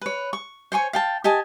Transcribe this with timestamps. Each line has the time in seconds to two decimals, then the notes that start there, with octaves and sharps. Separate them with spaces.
0.02 B4 C#5
0.33 C#6
0.72 C5 C#5 G#5 C#6
0.93 F5 G5 A5
1.24 G4 D#5 G#5 A5